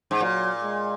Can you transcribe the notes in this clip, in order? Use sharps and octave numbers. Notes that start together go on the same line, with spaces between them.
G#2
A#2 F#3
G#3